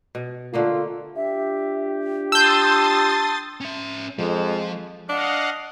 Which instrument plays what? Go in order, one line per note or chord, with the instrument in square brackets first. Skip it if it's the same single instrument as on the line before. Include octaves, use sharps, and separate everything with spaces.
[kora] B2
[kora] D3 A3 A#3 [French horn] F4
[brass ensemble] D4 F4 G4 [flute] E5
[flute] A5 [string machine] C6 D#6 A6 [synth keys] E6 G6
[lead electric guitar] C#4 E5
[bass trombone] F2 [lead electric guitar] F3 [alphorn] G#3
[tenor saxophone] D4 [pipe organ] D#5 F5 F#5